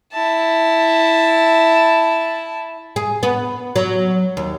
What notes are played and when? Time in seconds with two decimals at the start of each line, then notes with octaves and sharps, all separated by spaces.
0.13 E4 A5
2.96 G#4
3.23 B3
3.76 F#3
4.37 D#2